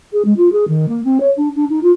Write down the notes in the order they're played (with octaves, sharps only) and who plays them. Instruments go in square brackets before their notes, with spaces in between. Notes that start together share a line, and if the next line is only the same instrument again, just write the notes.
[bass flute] G#4
G#3
F4
G#4
D#3
A#3
C4
C#5
D4
D4
D#4
F4